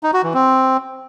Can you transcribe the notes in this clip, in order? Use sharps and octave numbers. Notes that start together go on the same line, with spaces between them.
D#4
F#4
E3
C4